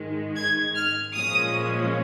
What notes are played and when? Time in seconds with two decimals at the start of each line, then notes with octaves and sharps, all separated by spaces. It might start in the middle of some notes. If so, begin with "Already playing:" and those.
Already playing: G#2 D#3 G#3
0.37 G#6
0.76 F6
1.15 A#2 F3 G#3 C#4 D#6